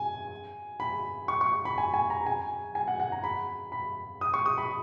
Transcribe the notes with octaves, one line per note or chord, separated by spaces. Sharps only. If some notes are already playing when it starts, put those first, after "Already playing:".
Already playing: G#5
B5
C#6
C#6
B5
G#5
G#5
A#5
G#5
G#5
F#5
F#5
A#5
B5
B5
D#6
C#6
D#6
B5